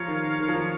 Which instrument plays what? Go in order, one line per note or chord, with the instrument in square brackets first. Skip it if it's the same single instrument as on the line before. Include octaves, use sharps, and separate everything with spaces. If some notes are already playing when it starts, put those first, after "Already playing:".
Already playing: [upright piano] F3 [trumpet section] F4 A#4 C#5 F5
[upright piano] D#3
D#3
D#3
F3
D#3